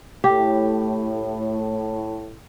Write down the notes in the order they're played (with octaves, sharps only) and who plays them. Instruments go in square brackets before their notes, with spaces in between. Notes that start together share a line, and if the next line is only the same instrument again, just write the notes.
[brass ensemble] A2 [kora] G4